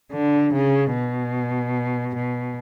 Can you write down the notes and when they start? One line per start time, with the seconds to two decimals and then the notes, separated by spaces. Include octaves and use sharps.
0.13 D3
0.54 C#3
0.93 B2
2.15 B2